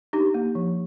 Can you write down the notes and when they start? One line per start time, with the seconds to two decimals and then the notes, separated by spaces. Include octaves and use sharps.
0.13 D4 D#4 G4
0.34 A#3
0.55 F3